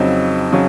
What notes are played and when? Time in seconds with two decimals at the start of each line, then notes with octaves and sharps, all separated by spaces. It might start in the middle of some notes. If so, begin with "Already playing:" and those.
Already playing: F2 C#3 F#3 C4 D#4
0.52 C#3 F#3